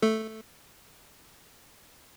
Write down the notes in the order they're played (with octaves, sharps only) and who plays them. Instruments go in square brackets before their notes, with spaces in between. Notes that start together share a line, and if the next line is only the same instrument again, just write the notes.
[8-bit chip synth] A3 A4